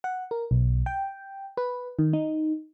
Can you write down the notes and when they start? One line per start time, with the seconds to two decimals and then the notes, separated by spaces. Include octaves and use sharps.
0.04 F#5
0.31 A#4
0.51 B1
0.86 G5
1.57 B4
1.99 D#3
2.13 D#4